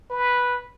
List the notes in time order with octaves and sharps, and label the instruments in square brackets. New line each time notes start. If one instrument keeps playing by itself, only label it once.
[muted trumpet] B4